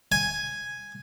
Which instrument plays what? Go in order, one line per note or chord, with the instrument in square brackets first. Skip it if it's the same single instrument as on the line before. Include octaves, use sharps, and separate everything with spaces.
[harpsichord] G#5